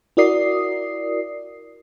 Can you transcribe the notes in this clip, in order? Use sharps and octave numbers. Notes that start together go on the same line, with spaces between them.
E4 F#4 A#4 D5 D#6 C7